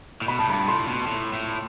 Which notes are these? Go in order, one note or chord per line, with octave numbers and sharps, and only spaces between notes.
A2
B2 B5
A2 A5
G2 B5
A2 C6
B2
A2
A2